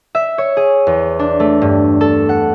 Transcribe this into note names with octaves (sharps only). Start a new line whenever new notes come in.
E5
C#5
G#4
E2
D4
A3
G2
A4
F#5